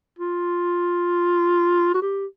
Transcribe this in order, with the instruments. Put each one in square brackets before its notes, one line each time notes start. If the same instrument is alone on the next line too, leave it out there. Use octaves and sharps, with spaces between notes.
[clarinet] F4
F#4
G4